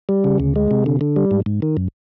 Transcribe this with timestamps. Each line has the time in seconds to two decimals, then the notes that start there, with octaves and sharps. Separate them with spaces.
0.09 G3
0.24 C#3
0.40 D2
0.56 G#3
0.71 C3
0.86 D3
1.01 D3
1.16 G3
1.31 G#2
1.46 G#2
1.62 D#3
1.77 F#2